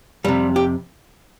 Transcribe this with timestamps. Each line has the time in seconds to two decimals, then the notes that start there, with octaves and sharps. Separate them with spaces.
0.24 F2 C3 G3
0.56 G4